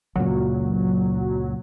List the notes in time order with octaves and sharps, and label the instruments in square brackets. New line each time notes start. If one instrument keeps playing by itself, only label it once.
[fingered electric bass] C#2 F#2 A#2 [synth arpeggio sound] F#3